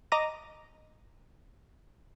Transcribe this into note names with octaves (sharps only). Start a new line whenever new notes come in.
D#5 A#5 D6 A#6 D#7